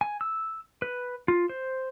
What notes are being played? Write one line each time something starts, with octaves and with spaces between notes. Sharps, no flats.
G#5
E6
B4
F4
C5